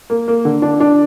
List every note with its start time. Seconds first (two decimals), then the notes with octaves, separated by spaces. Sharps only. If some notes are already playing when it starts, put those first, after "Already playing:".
0.10 A#3
0.28 A#3
0.45 D3
0.62 D4
0.80 D4